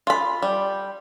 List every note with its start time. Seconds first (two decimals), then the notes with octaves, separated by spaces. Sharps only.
0.07 F4 B5
0.42 G3